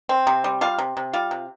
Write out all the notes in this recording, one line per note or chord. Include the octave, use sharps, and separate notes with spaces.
C4
C3
G3
G3 F4 F5
C3
C3
G3 F4 F5
C3